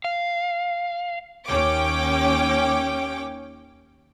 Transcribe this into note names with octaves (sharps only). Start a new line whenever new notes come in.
F5
D#2 C#4 G5 D6